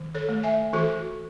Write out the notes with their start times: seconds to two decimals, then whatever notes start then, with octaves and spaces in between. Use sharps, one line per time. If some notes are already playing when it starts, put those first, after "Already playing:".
Already playing: D#3
0.15 A4 C#5
0.29 A3
0.43 E5 G#5
0.73 E3 F#4 A4